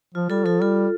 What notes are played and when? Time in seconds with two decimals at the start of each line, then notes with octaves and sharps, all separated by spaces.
0.15 F3 F4
0.30 G3 F4 A4
0.46 F3 F4 A4
0.62 G3 F4 A4